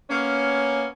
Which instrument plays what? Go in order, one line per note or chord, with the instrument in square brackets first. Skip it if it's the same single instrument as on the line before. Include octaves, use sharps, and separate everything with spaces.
[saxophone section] A#3 B3 C#4